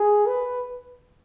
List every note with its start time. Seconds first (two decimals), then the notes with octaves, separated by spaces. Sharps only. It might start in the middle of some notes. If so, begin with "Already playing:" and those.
Already playing: G#4
0.26 B4